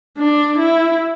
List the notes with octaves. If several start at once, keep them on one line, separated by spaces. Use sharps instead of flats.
D4
E4